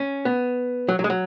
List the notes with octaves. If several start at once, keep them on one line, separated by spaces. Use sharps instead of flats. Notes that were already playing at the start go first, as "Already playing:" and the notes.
Already playing: C#4
B3
F#3
F#3
G#3
F#3